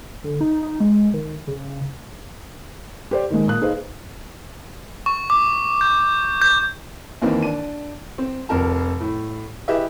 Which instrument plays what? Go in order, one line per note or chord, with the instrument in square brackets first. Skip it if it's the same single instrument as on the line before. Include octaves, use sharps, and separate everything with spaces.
[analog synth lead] D3
D#4
D#4
G#3
D#3
C#3
[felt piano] G4 C5 D5
D#3 G#3
A#2 D#6 F#6
D#4 G#4 B4 C5 F5
[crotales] C#6
D6
G6
G6
[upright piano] D#2 E3 A#3 C4 D#4
D4 D#7
C4
F1 F2 A#4 A5
A2
E4 G4 G#4 B4 D#5 E5